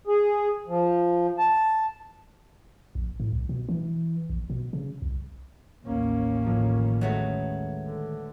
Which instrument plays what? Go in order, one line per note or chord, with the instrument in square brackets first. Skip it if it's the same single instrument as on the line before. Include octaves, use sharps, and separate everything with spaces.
[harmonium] G#4
F3
A5
[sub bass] A#1
A2
C2
B2
E3
A#1
B2
C#3
C2
[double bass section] A1 D#2 C#4 [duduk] A#3
[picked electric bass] A2 D#3 F3
[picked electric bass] D#3 G#3 [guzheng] F#3 A3 B3
[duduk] D3